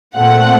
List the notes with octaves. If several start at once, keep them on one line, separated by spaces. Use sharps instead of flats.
A#2 A3 C4 F#5